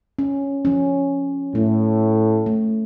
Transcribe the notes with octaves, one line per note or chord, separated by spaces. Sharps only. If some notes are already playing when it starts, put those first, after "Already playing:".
C#4
F3 C#4
A2 A3
A3